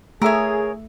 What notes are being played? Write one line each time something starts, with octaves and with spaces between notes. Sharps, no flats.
A3 G#4 A#4 C#5 E5